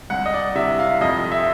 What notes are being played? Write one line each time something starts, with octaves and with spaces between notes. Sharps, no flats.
C2 F#5
D#5
D5
C3 E5
F5
F2 D#5
E5